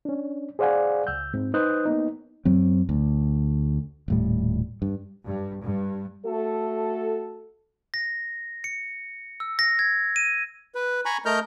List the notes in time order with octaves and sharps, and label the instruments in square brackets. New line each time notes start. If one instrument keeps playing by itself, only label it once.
[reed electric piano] C#4 D4
G#4 C5 D5 F5 F#5 G#5
C#2 E6 G6
G#2 C4
D#4 B4 C5 D#6 F#6 G6
A#3 B3 D#4
[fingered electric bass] F#2 F#3 C4
D2
D#1 A2 G3
G2
[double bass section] G2
G2
[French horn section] A3 F#4 A4
[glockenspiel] A#6
C#7
E6
A#6
G#6
D#7
[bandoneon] B4
G#5 A#5 B5 C#6
A3 A#4 D#5 A#5 F6 G6